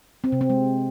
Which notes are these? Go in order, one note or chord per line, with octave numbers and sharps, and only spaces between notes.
C4
C3
C4
G#3